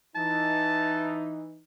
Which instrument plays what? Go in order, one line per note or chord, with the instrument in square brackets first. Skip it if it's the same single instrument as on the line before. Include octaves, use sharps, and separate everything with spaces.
[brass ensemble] E3 D#4 [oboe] A5